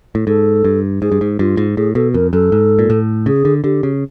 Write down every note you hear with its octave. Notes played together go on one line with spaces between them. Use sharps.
A2
G#2 A4
G2
G#2 G#4
G2
G#2
G2 F4
G#2
A2 G#4
B2 A4
F2 A#4
F#2 A4
G#2
A#2
A2
C#3 G#4
D3
D3 G4
C#3